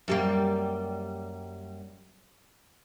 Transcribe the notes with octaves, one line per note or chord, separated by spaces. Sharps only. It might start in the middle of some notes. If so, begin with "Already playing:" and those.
F#2 G3 A#3